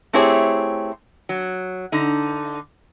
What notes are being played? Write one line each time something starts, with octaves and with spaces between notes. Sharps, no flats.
A3 C4 E4 G4 G#4 C#5
F#3
D3 D#4